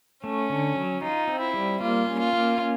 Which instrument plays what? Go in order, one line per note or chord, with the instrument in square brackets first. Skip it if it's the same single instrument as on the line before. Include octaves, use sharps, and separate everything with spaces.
[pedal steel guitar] A3 [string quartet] C#4
[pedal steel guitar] D3
F#3
[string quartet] D#4 [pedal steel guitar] F4
[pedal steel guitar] C4
[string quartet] E4
[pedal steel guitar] G3
[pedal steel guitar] A#3 [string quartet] F4
[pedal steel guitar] C#4
[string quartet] F4
[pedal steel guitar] A#3
C#4